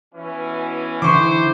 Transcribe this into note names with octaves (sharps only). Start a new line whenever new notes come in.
B2 E3 C#4
D3 E3 E4 C5 C#6 D6